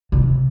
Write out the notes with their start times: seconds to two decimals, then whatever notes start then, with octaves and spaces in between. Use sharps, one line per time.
0.12 C3